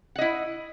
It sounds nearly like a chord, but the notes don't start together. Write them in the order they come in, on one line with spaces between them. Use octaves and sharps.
F#5 D#5 E4